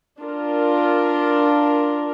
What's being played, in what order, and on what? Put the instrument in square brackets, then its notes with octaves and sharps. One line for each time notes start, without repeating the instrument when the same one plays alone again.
[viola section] D4 F4 A#4